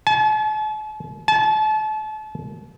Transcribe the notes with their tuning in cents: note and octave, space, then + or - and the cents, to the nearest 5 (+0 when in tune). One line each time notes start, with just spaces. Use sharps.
A5 -45
A5 -35